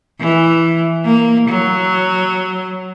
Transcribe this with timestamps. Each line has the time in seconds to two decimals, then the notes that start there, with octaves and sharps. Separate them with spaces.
0.20 E3
1.05 A#3
1.48 F#3